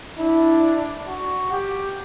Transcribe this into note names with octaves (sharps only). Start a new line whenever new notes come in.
D4 E4
F#4
G4